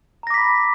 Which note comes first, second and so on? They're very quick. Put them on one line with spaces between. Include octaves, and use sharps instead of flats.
A#5 A#6 D6 B6 B5